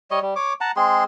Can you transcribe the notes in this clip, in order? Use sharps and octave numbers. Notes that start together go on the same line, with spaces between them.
G3 C#5 D#5
G3
C#5 D6
F#5 A5 A#5
G#3 C4 G#4 C6